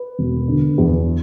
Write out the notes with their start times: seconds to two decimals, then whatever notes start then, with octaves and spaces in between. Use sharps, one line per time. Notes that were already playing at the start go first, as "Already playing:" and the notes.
Already playing: B4
0.19 E1
0.48 D3
0.78 E2